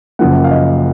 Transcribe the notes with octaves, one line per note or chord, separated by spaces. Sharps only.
F#1 F#2 F3 A#3 F#5
F5
D#5